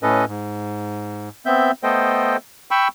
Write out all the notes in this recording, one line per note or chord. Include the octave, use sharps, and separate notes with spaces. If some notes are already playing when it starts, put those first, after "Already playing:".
A2 C#4 A4 B4 D#5
G#2
B3 C4 E5 G6
A3 B3 A4 C5 D#5 G5
G5 B5 C#6 E6